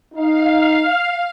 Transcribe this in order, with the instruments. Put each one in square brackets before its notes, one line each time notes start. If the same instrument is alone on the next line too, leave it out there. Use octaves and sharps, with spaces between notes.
[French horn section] D#4 [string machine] F5